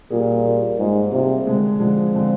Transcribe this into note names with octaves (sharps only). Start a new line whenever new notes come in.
A#2 G3 A#3 F4 G#4
G3 A#3 F4 G#4
G#2 G3 A#3 F4 G#4
C3 G3 A#3 F4 G#4
D3 G#3 C4
D3 F3 G#3 C4
D3 G#3 C4